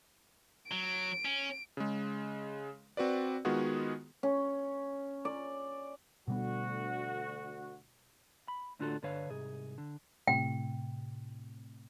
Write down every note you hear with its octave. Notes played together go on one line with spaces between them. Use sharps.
F#3 D7
C#4
C#3 G#3
C4 F#4 B4 D5
D#3 G#3 B3 F4 F#4 G#4
C#4
D5
D2 B2 G3 B3 F#4
B5
A2 D3 D4 F4 F#4 A4
G2 D3 D4 B4 C#5 F5
C2 G#2 G#4
D3
A2 C3 G5